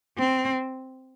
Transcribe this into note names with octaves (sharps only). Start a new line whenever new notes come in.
C4